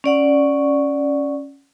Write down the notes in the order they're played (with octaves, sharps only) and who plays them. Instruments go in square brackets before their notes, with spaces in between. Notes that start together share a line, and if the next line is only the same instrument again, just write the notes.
[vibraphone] C#4 D5 F#5 C#6